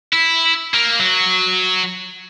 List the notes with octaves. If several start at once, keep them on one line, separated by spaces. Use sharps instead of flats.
E4
A#3
F#3